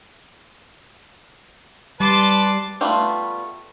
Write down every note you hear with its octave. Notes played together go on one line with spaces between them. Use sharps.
G3 B4 A5 C6 D6
G3 A3 B3 F4